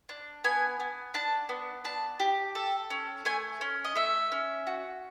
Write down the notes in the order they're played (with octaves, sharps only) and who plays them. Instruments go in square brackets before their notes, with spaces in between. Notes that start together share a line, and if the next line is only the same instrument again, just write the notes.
[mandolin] D4
B3 G#5
B3
D4 A5
B3
D4 A5
G4
A4
C#4
A3 G#5
C#4
D#5
A3 E5
C#4
F#4